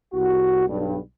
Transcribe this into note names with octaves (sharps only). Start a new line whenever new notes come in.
C2 F#4
B1 G2